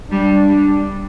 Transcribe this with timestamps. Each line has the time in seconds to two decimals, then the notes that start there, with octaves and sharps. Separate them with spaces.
0.11 G3 D4
0.49 G3